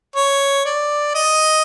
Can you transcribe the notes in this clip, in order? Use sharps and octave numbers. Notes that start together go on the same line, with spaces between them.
C#5
D5
D#5